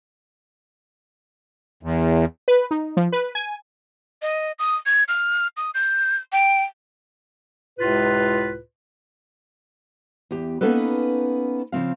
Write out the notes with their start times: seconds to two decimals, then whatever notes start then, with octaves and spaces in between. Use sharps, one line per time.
1.83 E2
2.48 B4
2.71 D#4
2.97 F3
3.12 B4
3.35 G#5
4.22 D#5
4.59 D#6
4.86 G#6
5.08 F6
5.57 D#6
5.74 G6
6.32 G5
7.79 C#2 A2 C3 F4 B4
10.31 E2 G4
10.61 A#3 B3 C#4 D#4 A4 B4
11.72 C#3 F3 C4 F5